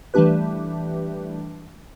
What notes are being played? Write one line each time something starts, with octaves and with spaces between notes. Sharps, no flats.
E3 G3 A3 D4 G4 B4